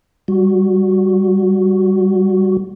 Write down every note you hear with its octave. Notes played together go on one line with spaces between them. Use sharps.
G3 F#4